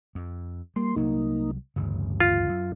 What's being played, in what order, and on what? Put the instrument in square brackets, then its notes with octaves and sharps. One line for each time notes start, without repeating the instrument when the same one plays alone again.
[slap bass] F2
[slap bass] G3 [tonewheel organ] A#3 C6
[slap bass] C2 F#3 [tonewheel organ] A#3 D#4
[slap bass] A1 D2 C#3 [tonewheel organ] G2
[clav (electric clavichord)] F4
[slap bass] F#2